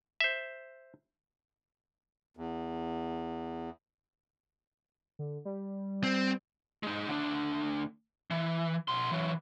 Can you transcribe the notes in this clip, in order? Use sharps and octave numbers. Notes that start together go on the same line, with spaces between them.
C5 E5
E2
D3
G3
C4
G#3 D#4
D2 D4
E3
B2 C6
E3 F#3